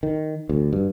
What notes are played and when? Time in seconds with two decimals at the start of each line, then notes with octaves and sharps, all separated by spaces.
0.03 D#3
0.49 D2
0.73 G2